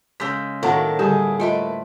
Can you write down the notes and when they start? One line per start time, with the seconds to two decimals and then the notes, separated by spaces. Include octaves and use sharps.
0.20 C#3 G#3 E6 G6 B6
0.63 A2 D#3 F#3 A#3 F#4 A5
0.99 D3 G3 E4 G4 G#4
1.40 A3 F4 B4 C5 D#5 G5